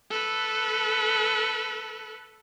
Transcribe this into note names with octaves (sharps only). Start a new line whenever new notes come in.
A4 B4